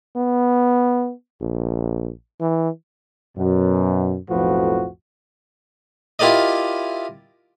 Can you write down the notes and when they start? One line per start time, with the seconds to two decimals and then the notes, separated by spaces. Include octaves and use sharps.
0.17 B3
1.42 A#1
2.41 E3
3.37 F#2 B2
4.30 B1 F2 A2 F3 F#4 B4
6.19 E4 F4 G4 A#4 D5 D#5